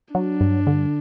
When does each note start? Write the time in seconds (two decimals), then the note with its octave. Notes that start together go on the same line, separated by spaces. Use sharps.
0.14 F#3 D4
0.41 G2
0.67 D3